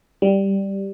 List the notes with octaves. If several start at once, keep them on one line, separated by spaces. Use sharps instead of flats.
G3